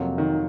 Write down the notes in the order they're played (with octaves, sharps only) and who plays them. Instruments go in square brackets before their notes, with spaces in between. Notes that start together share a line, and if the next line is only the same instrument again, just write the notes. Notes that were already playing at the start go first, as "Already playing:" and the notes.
Already playing: [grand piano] F2 C3 F#3 A#3 F4
[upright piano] D#3